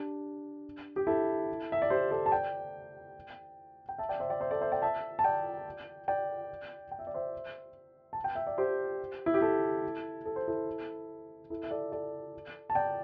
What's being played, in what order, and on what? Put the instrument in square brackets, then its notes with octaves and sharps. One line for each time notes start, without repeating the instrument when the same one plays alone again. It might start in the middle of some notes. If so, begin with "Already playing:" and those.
Already playing: [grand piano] D4 G4
G4
E4 A4
E5
D5
G4 C5
A4 D5
A5
D5 G5
G5
E5 A5
D5 G5
C5 E5
D5 G5
C5 E5
A4 D5
C5 E5
D5 G5
E5 A5
A5
D5 G5
D5 G5
G5
E5
D5
C5 E5
A5
G5
E5
D5
G4 C5
E4
G4
E4 A4
A4
C5
E4 A4
E4 A4
E5
A4 D5
A4 D5
A5
D5 G5